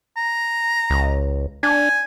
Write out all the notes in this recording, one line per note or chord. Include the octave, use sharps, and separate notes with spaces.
A#5
C#2
D4 G#5